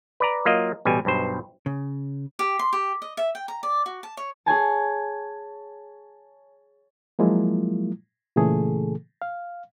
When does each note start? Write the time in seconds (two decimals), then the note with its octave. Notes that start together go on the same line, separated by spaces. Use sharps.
0.20 B4 D5 A#5
0.45 F#3 A#3 F4 D#5
0.85 A1 B2 G3 G#5
1.05 B1 G2 B2 C5
1.66 C#3
2.39 G4
2.59 C6
2.73 G4
3.02 D#5
3.17 E5
3.35 G5
3.48 A#5
3.63 D5
3.86 F#4
4.03 A5
4.17 C#5
4.46 G#4 C#5 G#5 A5
7.19 F3 F#3 G#3 A#3 E4 F4
8.36 A#2 C#3 E3 A3 G#4 A4
9.22 F5